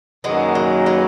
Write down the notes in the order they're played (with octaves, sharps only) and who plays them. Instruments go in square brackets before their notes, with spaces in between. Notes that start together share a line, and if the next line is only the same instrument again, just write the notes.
[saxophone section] F#2 D#3 F#3 A#3 [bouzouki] G#3 B3
[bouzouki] G#3
G#3 B3